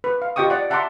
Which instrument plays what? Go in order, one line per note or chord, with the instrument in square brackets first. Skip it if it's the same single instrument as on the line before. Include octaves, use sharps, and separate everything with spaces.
[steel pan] B4
F5
F4 G4 D#5 G5 C#6 D#6
D5 F#5
E5 F#5 A5 A#5 C6 D6